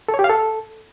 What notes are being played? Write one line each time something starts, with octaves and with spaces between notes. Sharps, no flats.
A4
C#5
G4
F5
A4